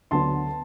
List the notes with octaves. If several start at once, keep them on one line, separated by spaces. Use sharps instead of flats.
D2 D3 F#3 B3 A5 C6